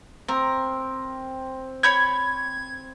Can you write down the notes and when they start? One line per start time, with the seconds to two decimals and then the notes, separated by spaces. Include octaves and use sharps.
0.28 C4 A#4
1.83 C#5 B5 G6 G#6